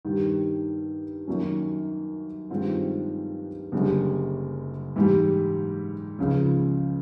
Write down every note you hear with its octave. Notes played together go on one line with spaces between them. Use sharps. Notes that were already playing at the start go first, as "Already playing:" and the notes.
G2 D#3 G3
F#2 D#3 F#3 A#3 C#4
G2 D#3 G#3 C4 F4
F#1 F#2 D3 G3
G#2 E3 G3
C#2 C#3 F3